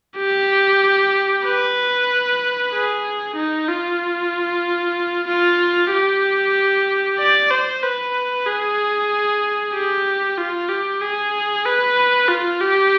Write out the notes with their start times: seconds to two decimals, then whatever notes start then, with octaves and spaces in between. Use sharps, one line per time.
0.17 G4
1.45 B4
2.73 G#4
3.36 D#4
3.68 F4
5.27 F4
5.92 G4
7.19 D5
7.51 C5
7.82 B4
8.46 G#4
9.74 G4
10.38 F4
10.69 G4
11.01 G#4
11.65 B4
12.28 F4
12.61 G4